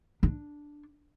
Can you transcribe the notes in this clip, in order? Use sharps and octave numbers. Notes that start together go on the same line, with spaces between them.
D4